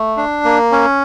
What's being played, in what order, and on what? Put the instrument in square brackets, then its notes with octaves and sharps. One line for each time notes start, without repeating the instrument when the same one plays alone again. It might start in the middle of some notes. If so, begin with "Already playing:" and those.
Already playing: [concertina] A3
D4
A#3
C#4